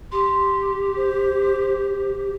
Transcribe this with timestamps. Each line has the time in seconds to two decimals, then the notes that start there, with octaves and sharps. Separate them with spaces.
0.12 G4 C6
0.97 C5